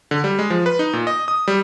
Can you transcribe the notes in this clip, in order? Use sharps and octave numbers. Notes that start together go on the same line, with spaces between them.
D3
G3
G#3
F3
B4
D#4
A#2
D#5
D#6
G3